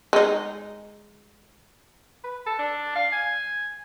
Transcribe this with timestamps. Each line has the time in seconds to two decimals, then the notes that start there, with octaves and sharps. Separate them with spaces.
0.13 G#3 D#4
2.24 B4
2.46 A4
2.59 D4
2.95 F5
3.12 G#5